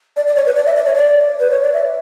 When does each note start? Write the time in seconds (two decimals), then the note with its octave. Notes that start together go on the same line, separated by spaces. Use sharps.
0.16 D5
0.27 D5
0.36 C#5
0.46 B4
0.56 D5
0.66 E5
0.76 D5
0.86 C#5
0.95 D5
1.40 B4
1.51 C#5
1.61 D5
1.73 E5